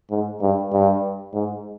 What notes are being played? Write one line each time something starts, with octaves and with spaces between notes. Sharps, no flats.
G#2
G2
G2
G#2